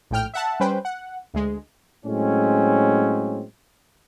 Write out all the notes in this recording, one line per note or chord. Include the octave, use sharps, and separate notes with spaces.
A#1 A2 G5 F6
E5 F#5 A5
G3 C#4 B4 C5 G5
F#5
D2 G#3
A2 F#3 G#3 C4 C#4